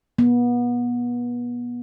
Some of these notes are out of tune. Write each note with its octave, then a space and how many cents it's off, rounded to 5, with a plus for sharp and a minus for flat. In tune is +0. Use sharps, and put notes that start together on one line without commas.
B3 -30